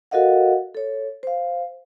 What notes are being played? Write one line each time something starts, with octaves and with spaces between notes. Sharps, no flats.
F#4 A4 A#4 D#5 F5 F#5
A4 C#5
C5 F5